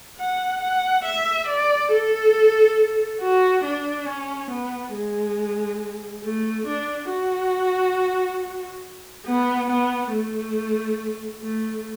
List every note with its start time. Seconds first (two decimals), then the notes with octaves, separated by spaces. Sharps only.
0.19 F#5
0.61 F#5
1.05 E5
1.47 D5
1.91 A4
3.21 F#4
3.65 D4
4.07 C#4
4.50 B3
4.94 G#3
6.23 A3
6.67 D4
7.09 F#4
9.26 B3
9.70 B3
10.12 A3
11.42 A3